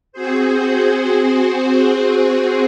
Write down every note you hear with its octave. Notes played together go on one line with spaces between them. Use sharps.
C4 F#4 G#4 C5